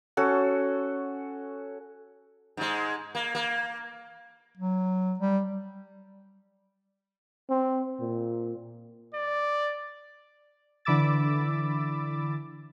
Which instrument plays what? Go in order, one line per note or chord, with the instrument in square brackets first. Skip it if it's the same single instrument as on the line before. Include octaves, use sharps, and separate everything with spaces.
[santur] C#4 F#4 A4
[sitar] G#2 G#3
A#3
A#3
[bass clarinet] F#3
G3
[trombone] C4
A#2
[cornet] D5
[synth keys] D3 E3 B5 D6 E6 A6